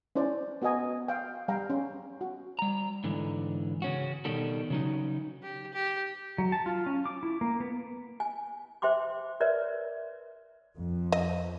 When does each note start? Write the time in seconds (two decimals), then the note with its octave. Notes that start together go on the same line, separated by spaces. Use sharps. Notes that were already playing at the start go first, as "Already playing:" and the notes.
0.15 C#4 E4 C5 D5
0.62 B3 F#4 A#4 D#5 G#5
1.08 F5 G5
1.48 G3 F5 G5 A#5
1.70 C#4
2.21 F#4
2.59 G3 A#5
3.04 G#2 D3 E3
3.82 C#3 C#4 F#4
4.25 B2 D#3 G3 A4
4.70 C#3 F#3 D#4
5.43 G4
5.73 G4
6.38 F#3
6.52 A5
6.66 F4
6.86 C#4
7.06 D6
7.23 E4
7.41 A#3
7.60 B3
8.20 G#5
8.82 C5 E5 G5 C6 D6
9.40 A#4 B4 C#5 D5 E5
10.78 F2
11.12 D#5